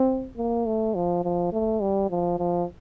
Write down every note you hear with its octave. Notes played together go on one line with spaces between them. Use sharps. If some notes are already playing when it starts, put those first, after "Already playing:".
Already playing: C4
A#3
A3
F3
F3
A3
G3
F3
F3